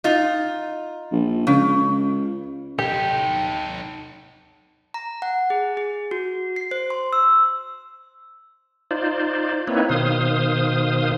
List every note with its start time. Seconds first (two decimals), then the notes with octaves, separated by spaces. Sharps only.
0.04 D#4 F4
1.12 A#1
1.47 C#2 C#3
2.79 D#4 G4 A4
4.94 A#5
5.22 F#5
5.50 G#4
5.77 G#4
6.11 F#4
6.56 C7
6.71 C5
6.90 C6
7.13 E6
8.91 D#4 F4 C5 D5
9.68 A#3 C4 D#4 E4 B4 C#5
9.89 B2 D#3 C5 F5 D#6